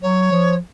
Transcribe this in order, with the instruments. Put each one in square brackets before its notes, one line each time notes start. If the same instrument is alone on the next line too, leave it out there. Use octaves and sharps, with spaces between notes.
[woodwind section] F#3 [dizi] C#5
[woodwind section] F3